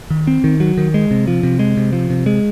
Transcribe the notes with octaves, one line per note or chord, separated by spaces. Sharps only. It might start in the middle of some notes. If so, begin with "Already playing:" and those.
D#3
C4
D#3
F#3
D#3
G#3
C3
F3
C3
G#3
C3
F3
C3
G#3